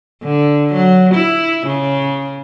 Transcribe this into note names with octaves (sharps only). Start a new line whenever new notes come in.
D3
F#3
E4
C#3